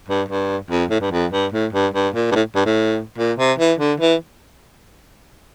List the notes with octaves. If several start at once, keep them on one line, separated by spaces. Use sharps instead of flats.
G2
G2
F2
A2
G2
F2
G2
A2
G2
G2
A#2
G2
A2
G2
A2
A#2
C3
E3
D3
E3